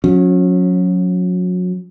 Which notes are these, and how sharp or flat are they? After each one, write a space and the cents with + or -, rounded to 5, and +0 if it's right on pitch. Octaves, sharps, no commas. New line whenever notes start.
F#3 -30 C#4 +0